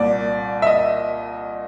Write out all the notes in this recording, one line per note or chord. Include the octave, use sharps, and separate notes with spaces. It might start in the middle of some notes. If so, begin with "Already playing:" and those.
Already playing: C2 A#2 D5
E5
D#5